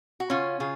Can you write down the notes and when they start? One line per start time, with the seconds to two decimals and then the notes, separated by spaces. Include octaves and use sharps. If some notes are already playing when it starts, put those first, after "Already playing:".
0.20 F#4
0.30 C#3 C#4 F4
0.60 C#3 F4 G#4